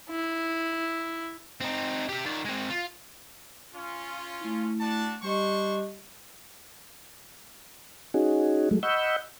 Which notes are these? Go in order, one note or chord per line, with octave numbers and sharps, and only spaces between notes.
E4
C4 D#4
G4 E5
D#3 D5
G#3 C4
F4
C#4 F4
A3 E4
D4 F#4 A5
G3 D4 G4 C5 D#5 C#6
C#4 D#4 F#4 G#4
F#3 G#3 A3
D#5 F#5 B5 C#6 E6 G6